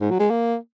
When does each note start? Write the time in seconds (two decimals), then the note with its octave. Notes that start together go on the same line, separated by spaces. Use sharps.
0.01 G#2
0.11 F#3
0.20 G#3
0.30 A#3